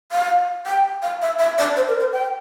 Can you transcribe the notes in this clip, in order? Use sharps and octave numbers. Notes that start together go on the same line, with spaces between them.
F5
G5
F5
E5
E5
D5
C5
A#4
C5
G5